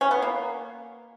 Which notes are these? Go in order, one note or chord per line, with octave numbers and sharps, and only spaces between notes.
C#4
B3
A#3